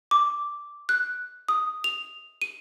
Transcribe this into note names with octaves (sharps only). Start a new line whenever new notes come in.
D6
F#6
D#6
F7
D#7